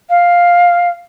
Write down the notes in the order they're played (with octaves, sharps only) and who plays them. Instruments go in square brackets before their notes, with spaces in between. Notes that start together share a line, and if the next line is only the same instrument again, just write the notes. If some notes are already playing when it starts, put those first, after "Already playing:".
[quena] F5